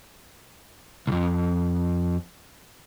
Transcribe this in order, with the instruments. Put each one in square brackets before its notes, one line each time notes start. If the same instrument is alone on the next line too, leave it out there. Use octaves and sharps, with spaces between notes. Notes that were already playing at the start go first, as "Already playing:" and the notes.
[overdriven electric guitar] C2 F2